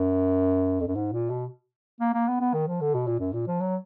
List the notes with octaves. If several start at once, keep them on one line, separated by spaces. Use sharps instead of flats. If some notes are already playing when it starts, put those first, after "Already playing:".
Already playing: F#2
F2
F#2
G#2
A#2
B2
A#3
A#3
B3
B3
D#3
F3
D3
B2
A#2
F#2
A#2
F3
F#3